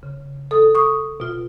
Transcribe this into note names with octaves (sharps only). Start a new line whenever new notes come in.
C#3
A4 D#6
C#6 D#6
B2 F4